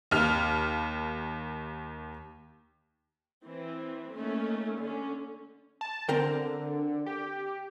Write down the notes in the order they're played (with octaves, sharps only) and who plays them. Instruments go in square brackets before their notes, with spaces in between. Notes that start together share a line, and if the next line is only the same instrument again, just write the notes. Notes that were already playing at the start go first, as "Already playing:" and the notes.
[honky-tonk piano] D#2 F6
[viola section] E3 C4
A3 A#3 C#4 D#4
D3 C#4
[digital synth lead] A5
[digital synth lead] D3 [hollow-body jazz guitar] C4 A#4 G5
[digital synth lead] G4